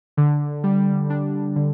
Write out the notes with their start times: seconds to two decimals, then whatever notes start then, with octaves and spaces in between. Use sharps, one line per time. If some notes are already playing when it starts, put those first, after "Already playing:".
0.17 D3
0.64 G3
1.10 D4
1.56 D3